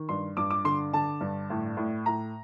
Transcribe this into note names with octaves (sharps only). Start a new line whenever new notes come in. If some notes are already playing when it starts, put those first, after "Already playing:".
Already playing: D#3
G2 C6
G2 D6
D6
D3 C6
D3 A5
G2
A2
A2
A2 A#5